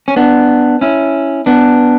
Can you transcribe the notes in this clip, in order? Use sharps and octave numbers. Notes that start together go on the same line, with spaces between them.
C#4
B3 D4
C#4 E4
B3 D4